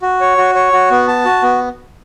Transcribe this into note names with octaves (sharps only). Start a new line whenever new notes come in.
F#4
C#5
F#4
C#5
F#4
B3
A5
F#4
B3